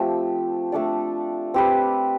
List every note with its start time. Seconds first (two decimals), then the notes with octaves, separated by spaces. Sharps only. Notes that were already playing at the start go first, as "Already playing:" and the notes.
Already playing: F3 A3 C4 G4
0.72 A3 D4 A4 D5
1.54 C4 G4 B4